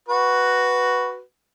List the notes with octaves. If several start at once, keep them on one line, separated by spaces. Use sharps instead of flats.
F#4 B4